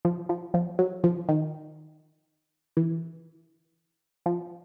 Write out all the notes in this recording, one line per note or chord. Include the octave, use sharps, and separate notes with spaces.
F3
F3
F3
F#3
F3
D#3
E3
F3